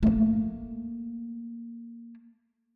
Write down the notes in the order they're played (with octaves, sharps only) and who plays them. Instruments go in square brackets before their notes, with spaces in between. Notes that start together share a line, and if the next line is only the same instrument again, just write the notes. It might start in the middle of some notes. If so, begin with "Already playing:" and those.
[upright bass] A3 A#3